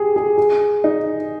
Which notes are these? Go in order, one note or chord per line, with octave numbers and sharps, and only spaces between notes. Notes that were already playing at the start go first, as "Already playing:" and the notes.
Already playing: G4 G#4
G#4
G#4
D#4